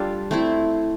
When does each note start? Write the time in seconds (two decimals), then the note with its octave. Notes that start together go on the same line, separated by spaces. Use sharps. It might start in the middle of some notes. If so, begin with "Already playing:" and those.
Already playing: G3 D4 F4 A4
0.31 A3 C4 E4